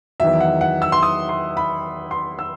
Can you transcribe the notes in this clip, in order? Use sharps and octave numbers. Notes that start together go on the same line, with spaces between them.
E2 D#3 F#3 E5
F#5
F#5
E6
C6
D#6
C6
B5
C6
E6